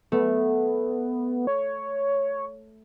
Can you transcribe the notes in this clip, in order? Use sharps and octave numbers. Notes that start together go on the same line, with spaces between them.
A3 B3
C#5